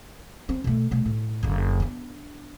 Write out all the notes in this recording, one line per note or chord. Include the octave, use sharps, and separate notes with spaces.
C4
B2 A3
B2 A3
A2
F#1 D3
B3 D4